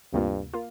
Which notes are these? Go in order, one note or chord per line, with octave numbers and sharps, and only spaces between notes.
D2 G2 C3 A#3 F4
A#3 F4